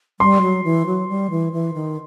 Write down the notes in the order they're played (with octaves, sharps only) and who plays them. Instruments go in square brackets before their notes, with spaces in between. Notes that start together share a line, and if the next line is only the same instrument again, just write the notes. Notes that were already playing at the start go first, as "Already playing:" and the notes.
[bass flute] G3 [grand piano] C6
[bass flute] F#3
E3
F#3
G3
E3
E3
D#3